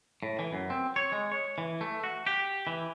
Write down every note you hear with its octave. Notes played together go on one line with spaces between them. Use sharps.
A2
E3
F#2
C4
C#5
G#3
C#5
E3
A3
F#4
G4
E3